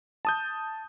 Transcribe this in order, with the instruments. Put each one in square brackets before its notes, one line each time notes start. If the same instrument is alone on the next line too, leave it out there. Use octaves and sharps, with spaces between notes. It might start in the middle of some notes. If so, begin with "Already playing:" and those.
[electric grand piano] A5 D#6 G6